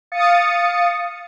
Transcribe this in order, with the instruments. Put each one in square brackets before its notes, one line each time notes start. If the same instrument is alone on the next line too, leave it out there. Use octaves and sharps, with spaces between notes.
[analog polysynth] F5 D#6 A6 C#7